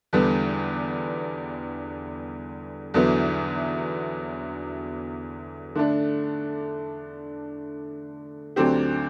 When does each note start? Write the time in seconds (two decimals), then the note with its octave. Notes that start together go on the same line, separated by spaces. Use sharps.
0.13 E2 D3 G3 B3 D4
2.94 E2 D3 F#3 B3 E4
5.75 D3 A3 D4
8.56 D2 D3 F#3 C4 G4